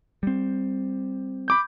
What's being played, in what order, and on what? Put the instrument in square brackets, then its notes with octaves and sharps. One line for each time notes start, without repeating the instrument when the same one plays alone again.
[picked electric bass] G3 C4
[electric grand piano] B5 D6 G6